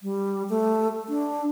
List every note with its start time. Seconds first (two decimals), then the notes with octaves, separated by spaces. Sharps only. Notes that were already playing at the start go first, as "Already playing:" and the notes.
0.03 G3
0.50 A3
1.09 D4